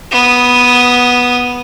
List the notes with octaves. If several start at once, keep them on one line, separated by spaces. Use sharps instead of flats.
B3 D#6